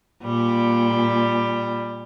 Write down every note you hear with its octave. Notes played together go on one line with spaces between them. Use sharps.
A#2 G3